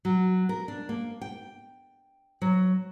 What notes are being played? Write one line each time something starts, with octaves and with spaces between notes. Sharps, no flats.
F#3
A#4
D4
A#3
G5
F#3